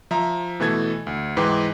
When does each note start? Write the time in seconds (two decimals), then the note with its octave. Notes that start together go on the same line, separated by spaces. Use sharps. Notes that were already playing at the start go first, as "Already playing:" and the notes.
0.11 F3 E5 A#5
0.60 B2 E3 A3 A4 G#6
1.07 D2
1.37 G#2 E3 B4 G5 D6